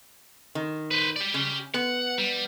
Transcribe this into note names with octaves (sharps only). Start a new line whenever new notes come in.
D#3
B4 C5
G4 D5
C#3
B3 F#5
G3